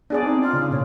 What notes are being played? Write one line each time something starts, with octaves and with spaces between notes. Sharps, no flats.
B3 D4 G#4 D5
C4 D#4
F4
C#3
A#2 C#5